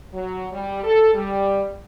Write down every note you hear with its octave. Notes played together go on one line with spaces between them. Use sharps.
F#3
G3
A4
G3